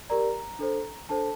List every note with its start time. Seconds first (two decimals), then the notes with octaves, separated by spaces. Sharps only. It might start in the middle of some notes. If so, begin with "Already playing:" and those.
0.10 G4 A#4 D5 A#5
0.59 D4 A4 C5
1.09 D4 A4 C5 A5